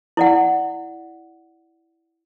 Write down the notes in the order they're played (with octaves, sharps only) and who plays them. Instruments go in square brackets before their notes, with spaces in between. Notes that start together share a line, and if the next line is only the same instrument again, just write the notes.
[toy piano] E4 D5 F#5